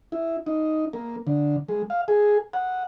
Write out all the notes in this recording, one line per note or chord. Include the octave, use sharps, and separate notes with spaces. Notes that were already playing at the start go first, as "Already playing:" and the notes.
E4
D#4
A#3
D3
G#3
F5
G#4
F#5